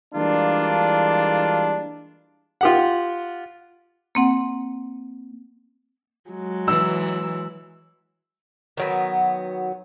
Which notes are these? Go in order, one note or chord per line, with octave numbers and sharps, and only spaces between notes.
E3 G3 G#3 A#3 D4 F4
F4 G4 F#5
A#3 C4 F#5
F#3 G#3
E3 E6
D#3 F#3 B3